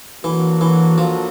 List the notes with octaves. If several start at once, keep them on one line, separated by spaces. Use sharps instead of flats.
E3 F#3 A#3 D4 F#4 A4
E3
F3